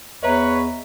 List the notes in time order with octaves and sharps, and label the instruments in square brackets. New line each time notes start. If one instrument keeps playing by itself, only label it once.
[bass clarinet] E2 [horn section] B4 C#5 [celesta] D#5 E5 A#5